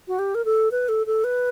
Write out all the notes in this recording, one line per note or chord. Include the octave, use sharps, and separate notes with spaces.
F#4
G4
A#4
A4
B4
A4
A4
B4